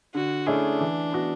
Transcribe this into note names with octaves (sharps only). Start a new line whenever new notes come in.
D3 F#4
A3 C#4 D4 E4 G#4
E3
B3 F#4